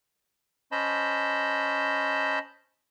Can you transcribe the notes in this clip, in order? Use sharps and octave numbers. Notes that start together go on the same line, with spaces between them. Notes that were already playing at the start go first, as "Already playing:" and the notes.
C#4 C5 D#5 A5 B5